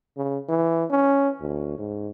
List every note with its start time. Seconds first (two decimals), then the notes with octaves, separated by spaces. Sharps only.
0.17 C#3
0.49 E3
0.90 C#4
1.40 D2
1.78 G#2